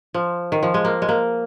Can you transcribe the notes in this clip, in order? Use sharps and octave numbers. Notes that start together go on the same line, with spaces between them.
F3
D#3
F3
G#3
A#3
G#3
A#3